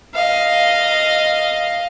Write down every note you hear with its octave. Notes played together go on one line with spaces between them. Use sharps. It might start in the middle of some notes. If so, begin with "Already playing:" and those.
D#5 F5